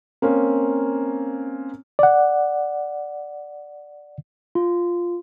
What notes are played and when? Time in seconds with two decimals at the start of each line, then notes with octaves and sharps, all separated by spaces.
0.22 A#3 C4 C#4
1.99 D5 F#5
4.55 F4